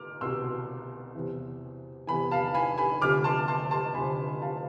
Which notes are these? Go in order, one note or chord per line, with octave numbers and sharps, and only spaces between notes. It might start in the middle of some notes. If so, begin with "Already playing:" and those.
Already playing: D6 F6
C2 B2 C6 E6
E2 C3 E3
E2 C3 E3 G#5 B5
F5 A5
G#5 B5
G#5 B5
D2 C3 F3 D6 F6
A5 C6
A5 C6
A5 C6
D2 C3 F3 G#5 B5
F5 A5